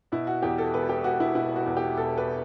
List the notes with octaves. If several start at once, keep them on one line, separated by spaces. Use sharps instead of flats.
B2 E4
F#4
E2 G4
A4
E1 B4
G4
E1 F#4
E4
B2 E4
F#4
E2
G4
E1 A4
B4